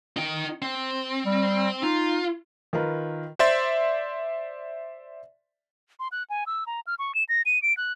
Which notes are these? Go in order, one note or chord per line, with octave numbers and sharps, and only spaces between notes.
D#4 G5
C4
G3
D#4 F4
D#3 F4 A#4 B4
C5 D5 E5 C6 A6
C6
F#6
G#5
E6
A#5
F6
C#6
E7
A#6
D#7
D7
F#6